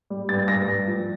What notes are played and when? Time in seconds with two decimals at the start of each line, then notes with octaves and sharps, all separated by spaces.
0.10 G3
0.29 G2 A6
0.48 G2 A#6
0.67 G2
0.87 F3